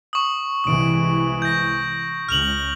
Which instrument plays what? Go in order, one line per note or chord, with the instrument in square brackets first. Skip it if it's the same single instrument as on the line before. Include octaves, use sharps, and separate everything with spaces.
[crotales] C#6 D#6
[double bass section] C2 E3 G#3 [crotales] D#6 D7
[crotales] G6 A#6
[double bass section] C#2 [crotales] F6 F7 F#7